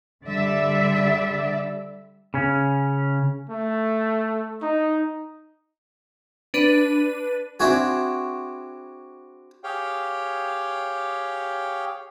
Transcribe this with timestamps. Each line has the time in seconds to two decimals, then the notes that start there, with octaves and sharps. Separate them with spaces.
0.24 D3 G3 D5 E5
2.34 C#3 C#4
3.50 A3
4.62 D#4
6.54 D4 B4 D#7
7.60 C4 D4 E4 F#4 G#4
9.63 G4 G#4 C#5 F5 G5